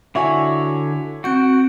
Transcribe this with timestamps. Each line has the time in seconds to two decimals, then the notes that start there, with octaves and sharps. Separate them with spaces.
0.15 D3 E4 F#4 C#5 G#5
1.24 C4 F#4 G6 D7